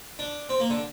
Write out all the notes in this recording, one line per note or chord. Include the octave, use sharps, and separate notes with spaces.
D4
C4
A#3
D3